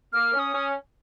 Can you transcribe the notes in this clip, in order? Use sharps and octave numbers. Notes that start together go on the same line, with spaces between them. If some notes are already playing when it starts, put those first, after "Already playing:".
A#3 F6
C#4
D#6
C#4